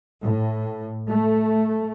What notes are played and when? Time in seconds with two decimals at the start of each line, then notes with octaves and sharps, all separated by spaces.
0.23 A2
1.10 A3